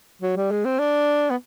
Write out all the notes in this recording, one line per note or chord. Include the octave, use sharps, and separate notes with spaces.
F#3
G3
G#3
C4
D4
B3